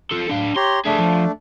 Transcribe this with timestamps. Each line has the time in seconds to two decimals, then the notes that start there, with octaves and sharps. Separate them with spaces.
0.11 F4 A4
0.29 D4 F5
0.56 G4 C#5 A#5 C6
0.86 A3 D4 G#4 E5
0.99 F3